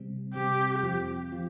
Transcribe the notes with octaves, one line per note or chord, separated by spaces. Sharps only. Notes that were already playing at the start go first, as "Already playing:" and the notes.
Already playing: C3 G3 C4
C3 G3 C4 G4
F2 F3 C4 F4
F3 C4 F4